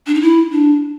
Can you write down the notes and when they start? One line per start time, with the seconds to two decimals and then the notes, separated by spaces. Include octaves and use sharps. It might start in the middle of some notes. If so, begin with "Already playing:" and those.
0.07 D4
0.14 D#4
0.22 E4
0.51 D4